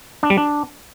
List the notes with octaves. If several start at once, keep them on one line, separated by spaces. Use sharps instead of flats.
D4
G3
D4